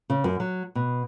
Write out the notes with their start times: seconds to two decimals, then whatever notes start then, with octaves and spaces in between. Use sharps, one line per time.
0.10 C#3
0.24 F#2
0.40 F#3
0.75 B2